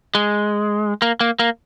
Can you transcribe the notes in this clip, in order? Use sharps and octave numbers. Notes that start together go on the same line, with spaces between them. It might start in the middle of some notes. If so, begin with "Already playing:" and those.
G#3
A#3
A#3
A#3